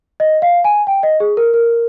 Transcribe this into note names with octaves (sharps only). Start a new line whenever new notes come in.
D#5
F5
G#5
G5
D#5
G#4
A#4
A#4